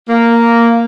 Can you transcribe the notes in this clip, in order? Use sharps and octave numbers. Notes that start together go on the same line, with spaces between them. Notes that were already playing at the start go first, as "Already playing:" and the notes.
A#3